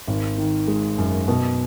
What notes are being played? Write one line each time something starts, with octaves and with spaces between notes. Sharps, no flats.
G#1
D#3
G#3
F#2
B2